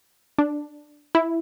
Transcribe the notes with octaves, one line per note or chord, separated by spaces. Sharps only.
D4
E4